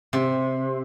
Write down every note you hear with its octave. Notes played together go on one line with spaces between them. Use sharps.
C3